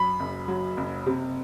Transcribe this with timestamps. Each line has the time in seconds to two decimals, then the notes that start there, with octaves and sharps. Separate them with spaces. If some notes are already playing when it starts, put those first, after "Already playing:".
Already playing: F#2 B5
0.20 F#1
0.48 F#3
0.77 F#1
1.06 C3